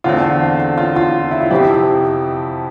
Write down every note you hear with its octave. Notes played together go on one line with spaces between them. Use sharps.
E2 D3 A3 C4 F4
F4
F4
E4
F4
F2 C3 F3 C4 E4 G4